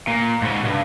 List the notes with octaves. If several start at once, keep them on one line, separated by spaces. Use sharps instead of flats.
A#2
G#2 C#3
C2 G2